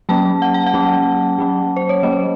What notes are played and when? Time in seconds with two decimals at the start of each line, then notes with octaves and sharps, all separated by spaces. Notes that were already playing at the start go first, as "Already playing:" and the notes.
0.09 F#3 A#3 C#4 A5
0.42 F#5
0.54 A5
0.66 F#5
0.74 F#3 A#3 C#4
1.39 F#3 A#3 C#4
1.77 C5
1.89 C#5
2.03 F#3 A#3 C#4 D#5